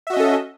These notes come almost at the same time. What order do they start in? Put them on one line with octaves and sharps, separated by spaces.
E5 F#4 D#5 C#4 A4